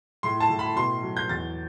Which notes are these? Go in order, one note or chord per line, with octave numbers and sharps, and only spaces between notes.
A2 C6
A5
A2
B5
B2 C6
F#3
G6
E2 A6